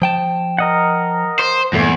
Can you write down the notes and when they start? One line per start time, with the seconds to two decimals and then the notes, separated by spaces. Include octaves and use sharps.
0.02 F3 G5 A5
0.59 A#4 D#5 F#5
1.39 C5
1.73 E2 G2 A#2 A3